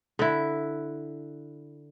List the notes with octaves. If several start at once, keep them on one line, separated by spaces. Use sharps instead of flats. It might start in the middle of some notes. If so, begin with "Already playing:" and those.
D3 E4